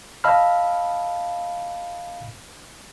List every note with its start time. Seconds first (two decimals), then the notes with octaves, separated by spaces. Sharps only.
0.24 D#5 F5 A5 B5 E6 F6